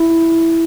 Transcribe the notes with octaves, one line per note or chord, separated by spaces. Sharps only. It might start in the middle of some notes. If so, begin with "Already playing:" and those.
Already playing: E4